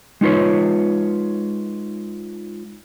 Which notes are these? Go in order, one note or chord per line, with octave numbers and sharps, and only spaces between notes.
G#3 D#4 F4 B4 C#5